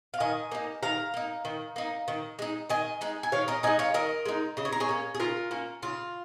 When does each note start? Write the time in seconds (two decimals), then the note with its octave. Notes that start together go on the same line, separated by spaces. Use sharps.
0.14 F5
0.20 D#3 D#5 G#5
0.52 A#3 D#4
0.83 D#3 F5 A#5
1.14 A#3 D#4
1.45 D#3
1.76 A#3 D#4
2.08 D#3
2.39 G#3 D#4
2.69 D#3 D#5 G#5
3.01 G#3 D#4
3.23 G#5
3.32 D#3 C#5 F5
3.48 A#4 D#5
3.63 G#3 D#4 D#5 G#5
3.79 C#5 F5
3.94 D#3 A#4 D#5
4.25 G#3 D#4
4.57 C#3 D#5
4.65 C#5
4.72 A#4
4.80 G#4 C#5
4.89 A#3 C#4
5.15 G#4
5.20 C#3 F4 A#4
5.51 A#3 C#4
5.82 C#3 F4